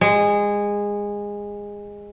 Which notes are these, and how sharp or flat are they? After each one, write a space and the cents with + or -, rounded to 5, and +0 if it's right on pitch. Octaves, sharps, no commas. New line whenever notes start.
G#3 -20